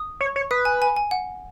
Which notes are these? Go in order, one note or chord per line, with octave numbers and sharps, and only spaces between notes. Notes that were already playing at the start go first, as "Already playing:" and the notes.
Already playing: D#6
C#5
C#5
B4 D#6
G#5
G#5
G#5
F#5